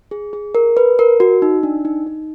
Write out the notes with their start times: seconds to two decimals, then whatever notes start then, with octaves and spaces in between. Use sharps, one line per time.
0.11 G#4
0.33 G#4
0.55 A#4
0.77 B4
0.99 A#4
1.20 F#4
1.42 D#4
1.63 D4
1.85 D#4
2.07 D#4